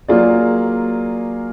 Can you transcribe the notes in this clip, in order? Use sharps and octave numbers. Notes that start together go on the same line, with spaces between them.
F#3 A#3 F4 G#4 D5